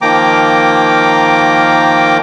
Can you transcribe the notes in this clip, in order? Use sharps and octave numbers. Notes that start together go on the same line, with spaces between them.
D#3 F3 A#3 G5 A#5 D6